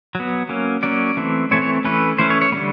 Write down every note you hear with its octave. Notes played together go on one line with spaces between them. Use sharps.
F#3 B3
F#3 A#3 C#4
F#3 A#3 C#4 D5
E3 A3 C4
E3 A3 C4 C#5
C#5
E3 A3 C#4 B4
E3 A3 C#4 C5
C#5
C#5
D3 G3 B3